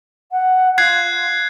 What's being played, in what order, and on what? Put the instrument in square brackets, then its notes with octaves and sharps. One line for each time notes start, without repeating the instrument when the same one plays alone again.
[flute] F#5
[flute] F4 [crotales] F#6 G#6 C7